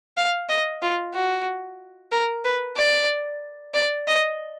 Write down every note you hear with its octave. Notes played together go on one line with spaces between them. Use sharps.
F5
D#5
F4
F#4
A#4
B4
D5
D5
D#5